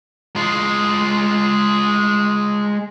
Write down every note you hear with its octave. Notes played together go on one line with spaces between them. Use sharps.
G#3 F4